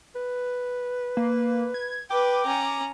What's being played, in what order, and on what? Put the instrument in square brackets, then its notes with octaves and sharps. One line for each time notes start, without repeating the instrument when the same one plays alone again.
[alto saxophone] B4
[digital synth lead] A#3
G#6
[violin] B4 [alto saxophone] G5 [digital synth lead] D6
[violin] C#4 A#5